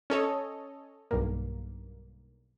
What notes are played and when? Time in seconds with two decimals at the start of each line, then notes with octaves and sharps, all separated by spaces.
0.10 C#4 A4 C#5 D#5
1.11 B1 G2 A#3